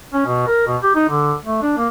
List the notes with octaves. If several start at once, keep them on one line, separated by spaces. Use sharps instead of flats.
C#4
B2
A#4
B2
G4
D#4
D3
A3
D4
A#3